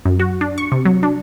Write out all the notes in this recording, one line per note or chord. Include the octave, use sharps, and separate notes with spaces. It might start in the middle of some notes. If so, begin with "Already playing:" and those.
F#2
F#4
D4
C#6
C3
F#3
D4